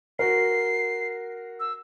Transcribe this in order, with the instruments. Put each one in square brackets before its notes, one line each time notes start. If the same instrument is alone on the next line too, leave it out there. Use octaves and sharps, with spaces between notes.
[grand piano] F#4 A#4 [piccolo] C7
[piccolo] E6